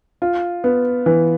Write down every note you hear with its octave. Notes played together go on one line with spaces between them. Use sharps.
F4
B3
E3